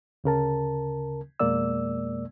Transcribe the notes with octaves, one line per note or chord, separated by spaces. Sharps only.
D2 C#3 A#4 A5
F2 B2 G#3 A#3 D5 E6